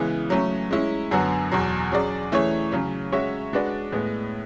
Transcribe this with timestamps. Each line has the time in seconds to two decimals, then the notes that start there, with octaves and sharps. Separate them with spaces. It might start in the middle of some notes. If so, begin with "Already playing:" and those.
Already playing: C#3 E3 G#3 B3
0.30 F#3 A3 C#4
0.71 G#3 C#4 E4
1.11 F#2 D3 F#3 B3 F#4
1.52 E2 B2 F#3
1.92 F#3 C#4 G#4 D5
2.32 E3 A3 C#4 G#4 C#5
2.72 C#3 F#3 C#4
3.12 G#3 C#4 F#4 C#5 E5
3.53 G#3 D4 F#4 B4 D5
3.92 A2 G#3 B3